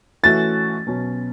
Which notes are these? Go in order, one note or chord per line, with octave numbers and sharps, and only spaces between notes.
E3 A3 C#4 F#4 A6
B2 F#3 C#4